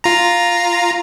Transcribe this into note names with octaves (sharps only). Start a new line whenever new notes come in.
F4 A#5